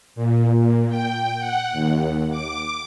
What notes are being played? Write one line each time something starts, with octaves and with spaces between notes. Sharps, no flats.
A#2
G5
F#5
D#2
D6